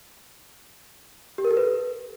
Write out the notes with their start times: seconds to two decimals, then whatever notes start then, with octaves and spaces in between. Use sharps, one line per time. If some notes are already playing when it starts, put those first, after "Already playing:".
1.38 G4
1.44 A#4
1.51 A4
1.57 B4